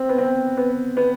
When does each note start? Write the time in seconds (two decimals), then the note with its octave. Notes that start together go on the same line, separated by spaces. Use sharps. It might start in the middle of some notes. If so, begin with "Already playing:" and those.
Already playing: C4
0.09 B3
0.18 C4
0.57 B3
0.97 B3